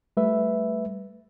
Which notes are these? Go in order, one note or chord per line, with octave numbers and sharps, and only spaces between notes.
G3 A3 B4 E5